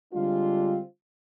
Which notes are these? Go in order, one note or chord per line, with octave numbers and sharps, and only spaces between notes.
D3 G3 G#3 C4 D4 F4